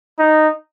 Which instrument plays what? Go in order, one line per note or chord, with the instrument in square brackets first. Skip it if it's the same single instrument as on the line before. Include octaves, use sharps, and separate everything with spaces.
[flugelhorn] D#4